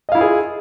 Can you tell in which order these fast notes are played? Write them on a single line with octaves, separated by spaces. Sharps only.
D#5 F5 E4 F4 G#4